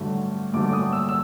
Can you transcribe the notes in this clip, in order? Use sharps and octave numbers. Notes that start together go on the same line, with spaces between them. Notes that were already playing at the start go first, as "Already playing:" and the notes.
Already playing: A1 G2 D3 F#3 A3
A1 G2 D3 F#3 A3 D6
D6
D#6
E6
E6